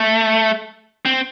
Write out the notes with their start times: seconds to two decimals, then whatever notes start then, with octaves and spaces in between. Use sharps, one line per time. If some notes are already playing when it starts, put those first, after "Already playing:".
Already playing: A3
1.05 C4